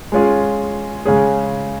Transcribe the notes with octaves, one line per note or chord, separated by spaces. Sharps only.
G#3 C#4 F4 G#4
C#3 G#3 C#4 G#4